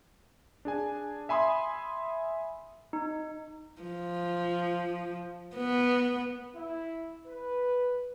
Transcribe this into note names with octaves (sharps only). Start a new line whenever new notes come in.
D4 G#4 G#5
E5 G#5 B5 C6 D#6
D#4
F3
B3
E4
B4